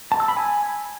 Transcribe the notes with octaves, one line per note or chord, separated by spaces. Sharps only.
A5
E6
B5
G#5